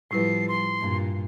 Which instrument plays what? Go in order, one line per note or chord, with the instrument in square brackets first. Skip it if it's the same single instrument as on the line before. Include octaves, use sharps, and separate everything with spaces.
[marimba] A2 E4 B4 [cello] F3 G3 [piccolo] C7
[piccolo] C6
[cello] G2 A#2